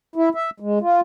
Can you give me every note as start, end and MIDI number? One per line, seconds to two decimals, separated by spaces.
0.16 0.29 64
0.35 0.50 76
0.60 0.79 56
0.81 1.01 65